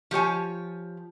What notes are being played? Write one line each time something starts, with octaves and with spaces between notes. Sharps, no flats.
F3 G4 C#5 G#5